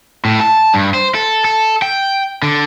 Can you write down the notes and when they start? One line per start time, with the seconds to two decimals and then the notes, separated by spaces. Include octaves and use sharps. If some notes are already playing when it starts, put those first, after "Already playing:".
0.25 A2
0.41 A5
0.74 G2
0.94 C5
1.15 A4
1.45 A4
1.82 G5
2.43 D3